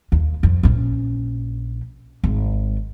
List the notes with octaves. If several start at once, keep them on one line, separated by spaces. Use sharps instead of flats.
D#2
F2
A#1 C#4
G#1